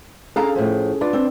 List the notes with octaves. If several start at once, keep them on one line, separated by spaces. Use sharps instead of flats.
C#4 D4 G#4 A4 F5 A#5
A2 F3
D4 F4 B4 D5
C4